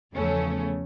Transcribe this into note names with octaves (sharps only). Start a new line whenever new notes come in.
E2 C#3 F3 A3 C#4